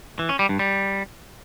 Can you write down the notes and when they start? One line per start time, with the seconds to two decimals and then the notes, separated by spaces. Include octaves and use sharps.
0.19 E3
0.29 C#4
0.39 G3
0.49 G2
0.59 G3